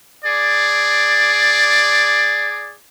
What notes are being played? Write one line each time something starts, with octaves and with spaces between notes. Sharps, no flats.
G#4 D5